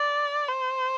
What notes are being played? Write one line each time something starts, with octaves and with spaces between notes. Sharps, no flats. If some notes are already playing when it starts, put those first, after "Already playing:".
Already playing: D5
C5